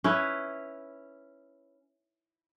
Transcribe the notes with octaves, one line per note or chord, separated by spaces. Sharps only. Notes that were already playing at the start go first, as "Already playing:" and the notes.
C#4 E4 B4